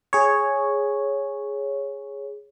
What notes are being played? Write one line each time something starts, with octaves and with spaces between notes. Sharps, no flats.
G#4 C#5